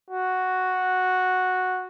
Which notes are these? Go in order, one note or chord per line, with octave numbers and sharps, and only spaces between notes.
F#4